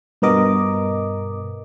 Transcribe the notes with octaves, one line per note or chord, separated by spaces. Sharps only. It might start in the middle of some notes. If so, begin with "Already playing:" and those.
G2 B2 B3 A#4 D#5 D6